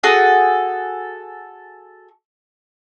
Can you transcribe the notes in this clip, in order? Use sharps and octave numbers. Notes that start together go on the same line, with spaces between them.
F#4 G#4 A4